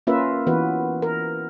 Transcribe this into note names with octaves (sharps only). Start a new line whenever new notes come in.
A#3 C#4 F4 A#4 B4 E5
E3 B3 F#4 B4
A#4